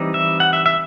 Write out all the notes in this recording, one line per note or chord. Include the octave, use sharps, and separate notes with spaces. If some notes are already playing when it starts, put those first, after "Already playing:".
Already playing: E3 G3 C4 D#4
E5
F#5
E5
E5